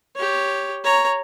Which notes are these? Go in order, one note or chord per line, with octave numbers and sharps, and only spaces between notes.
G4 C#5
C#5 A#5